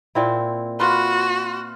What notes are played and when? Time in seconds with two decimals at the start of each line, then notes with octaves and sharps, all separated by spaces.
0.15 A#2 C4 E4
0.80 F4 F#4 B4